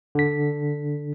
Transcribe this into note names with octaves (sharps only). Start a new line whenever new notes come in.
D3 B6